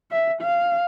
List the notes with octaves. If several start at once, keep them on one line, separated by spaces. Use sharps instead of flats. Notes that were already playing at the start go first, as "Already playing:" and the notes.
E5
F5